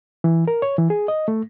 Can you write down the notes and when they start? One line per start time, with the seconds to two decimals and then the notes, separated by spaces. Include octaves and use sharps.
0.24 E3
0.48 A#4
0.62 C#5
0.78 E3
0.90 G#4
1.08 D#5
1.28 A3